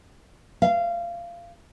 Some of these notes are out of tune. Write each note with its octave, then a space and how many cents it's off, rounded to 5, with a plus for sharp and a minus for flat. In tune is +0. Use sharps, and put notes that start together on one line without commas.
F5 -20